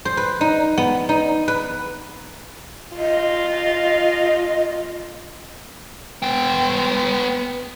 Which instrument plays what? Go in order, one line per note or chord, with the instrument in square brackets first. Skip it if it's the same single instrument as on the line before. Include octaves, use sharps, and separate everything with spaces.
[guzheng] C5
B4
D#4
B3
D#4
B4
[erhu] F4 [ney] D#5
[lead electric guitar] B3 G5